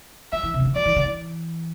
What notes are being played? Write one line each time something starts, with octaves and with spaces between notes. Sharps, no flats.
F3 E5
E3
C3
E3
D3
F3 D5
E3
D3
E3